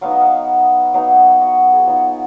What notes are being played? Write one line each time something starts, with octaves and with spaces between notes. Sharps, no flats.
F#3 B3 D#4 F5
D#5
F5
F#3 B3 D#4 F5
F#4
G#4
F#4
F#3 B3 D#4 F4